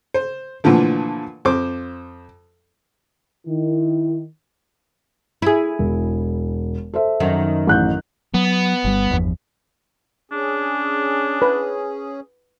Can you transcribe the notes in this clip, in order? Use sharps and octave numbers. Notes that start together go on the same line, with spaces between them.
C5
A#2 D3 E3 F3 A3
F2 C5 D6
D#3 E4
E4 G#4
E1
A4 C5 E5
F#2 D#3
A1 F#6 G6
F#3 B3
G1 G3
G1 E2 F3
C#4 D4 G#4
B4